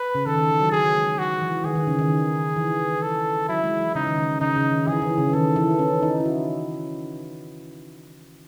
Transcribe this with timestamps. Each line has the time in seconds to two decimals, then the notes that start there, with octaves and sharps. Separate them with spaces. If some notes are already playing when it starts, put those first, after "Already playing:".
Already playing: B4
0.15 C#3
0.26 D#3 A4
0.38 D#3
0.49 E3
0.61 F#3
0.72 F#3 G#4
0.95 G#3
1.18 F#3 F#4
1.41 E3
1.64 D#3 G#4
1.75 D#3
1.87 C#3
1.99 D#3
2.56 E3
3.02 A4
3.48 F#3 E4
3.64 G#3
3.79 E3
3.95 C#3 D#4
4.06 D#3
4.18 C#3
4.41 C#3 D#4
4.56 C#3
4.72 D#3
4.87 E3 G#4
5.02 E3
5.18 C#3
5.33 D#3 A4
5.56 E3
5.79 C#4
6.03 D#4
6.20 E4
6.25 F#4